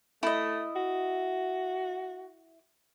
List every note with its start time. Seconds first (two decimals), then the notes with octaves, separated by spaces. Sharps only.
0.23 A3 E4 D#5
0.76 F#4